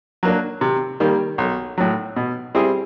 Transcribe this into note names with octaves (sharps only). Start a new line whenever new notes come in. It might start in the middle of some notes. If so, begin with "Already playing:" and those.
F#3 A#3 D4
C3
D#3 G3 A#3
B1
A2 F#3
B2
G3 C4 E4 G#4